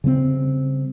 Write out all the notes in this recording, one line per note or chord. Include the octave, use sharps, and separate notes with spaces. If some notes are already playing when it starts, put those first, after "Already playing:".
C#3 G3 B3 C4